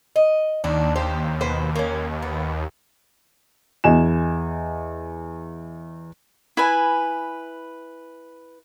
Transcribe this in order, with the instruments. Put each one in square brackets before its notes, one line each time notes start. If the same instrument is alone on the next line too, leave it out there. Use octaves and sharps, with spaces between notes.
[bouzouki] D#5
[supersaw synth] D#2 [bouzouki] D4
[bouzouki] G4 C5
B2 B4 C5
A#3 C#4
B3
[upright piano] E2 D#5 G#5 E7
[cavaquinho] E4 B4 G#5